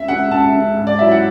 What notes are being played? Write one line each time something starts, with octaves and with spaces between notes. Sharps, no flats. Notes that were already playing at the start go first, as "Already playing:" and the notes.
Already playing: C#2 E5
C#3 G#3 F#5
C#2 A5
C#3 G#3
G#2
D5
F#3 C#4 E4 E5
F#5